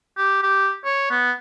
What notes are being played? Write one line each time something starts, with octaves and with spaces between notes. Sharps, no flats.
G4
G4
C#5
B3